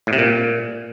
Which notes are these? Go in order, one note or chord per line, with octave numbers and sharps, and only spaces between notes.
A2
C3
A#2